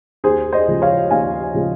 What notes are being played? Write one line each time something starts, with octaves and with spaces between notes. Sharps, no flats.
D#2 G#4 C5
C5 D#5
C#3 F3 G#3
C#5 F5
D#2 F5 G#5
C#3 F3 G#3